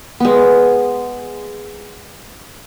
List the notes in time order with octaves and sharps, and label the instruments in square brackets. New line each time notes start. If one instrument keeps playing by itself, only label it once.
[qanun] G#3 B3